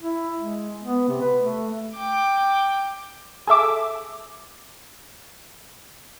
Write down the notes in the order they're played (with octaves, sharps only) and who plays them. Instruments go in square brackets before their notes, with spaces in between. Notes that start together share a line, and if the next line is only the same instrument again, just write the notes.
[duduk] E4
G#3
B3
C3
B4
A3
[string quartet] G5 D6
[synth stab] G#4 A4 E5 D6